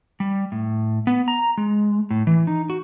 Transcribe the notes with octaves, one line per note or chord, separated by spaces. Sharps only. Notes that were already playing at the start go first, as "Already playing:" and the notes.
G3
A2
B3
A#5
G#3
A2
E3
D#4
F#4